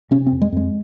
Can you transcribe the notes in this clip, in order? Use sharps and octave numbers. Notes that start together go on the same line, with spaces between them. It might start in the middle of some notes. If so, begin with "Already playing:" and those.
C3 C#4
C4
F2
G#3
F2 G#3